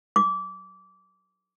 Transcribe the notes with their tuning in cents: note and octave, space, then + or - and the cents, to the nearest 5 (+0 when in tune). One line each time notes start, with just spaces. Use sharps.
D6 -25